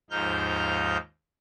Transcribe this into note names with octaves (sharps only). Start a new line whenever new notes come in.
D#2 G#2 F3 D#4 F6 G6